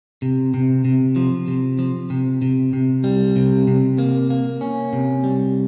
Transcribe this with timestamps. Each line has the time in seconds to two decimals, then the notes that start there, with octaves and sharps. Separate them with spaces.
0.22 C3
0.54 C3
0.85 C3
1.16 F3
1.48 C3
1.79 F3
2.10 C3
2.42 C3
2.73 C3
3.04 G3
3.36 C3
3.67 C3
3.99 A#3
4.30 A#3
4.61 C#4
4.93 C3
5.24 G3